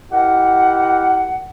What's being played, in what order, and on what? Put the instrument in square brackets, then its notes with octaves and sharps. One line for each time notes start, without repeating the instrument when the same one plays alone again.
[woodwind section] E4 G4 A#4 D#5 F#5